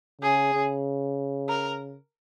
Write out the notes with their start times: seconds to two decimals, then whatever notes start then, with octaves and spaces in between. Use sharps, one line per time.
0.22 C#3 G#4
0.54 C#3
1.48 A#4